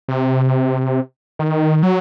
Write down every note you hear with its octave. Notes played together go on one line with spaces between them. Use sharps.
C3
D#3
F#3